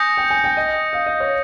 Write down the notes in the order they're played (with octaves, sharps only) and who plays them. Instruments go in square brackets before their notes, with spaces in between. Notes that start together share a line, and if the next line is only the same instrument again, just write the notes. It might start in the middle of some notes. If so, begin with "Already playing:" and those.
Already playing: [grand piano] G#5 [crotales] D#6 G6 A#6 C#7
[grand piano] G5
G#5
G5
D#5
F5
D#5
C#5